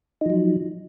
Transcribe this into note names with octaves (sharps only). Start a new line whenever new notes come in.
F3 F#3 D#4